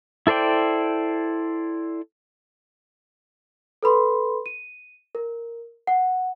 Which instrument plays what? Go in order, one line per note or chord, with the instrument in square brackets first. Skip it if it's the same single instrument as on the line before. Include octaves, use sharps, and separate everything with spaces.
[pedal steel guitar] E4 A4 C5 D5 G5
[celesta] A4 B4 B5 C6
D#7
A#4
F#5